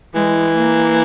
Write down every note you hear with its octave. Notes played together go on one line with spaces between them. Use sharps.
E3 G#3
A#3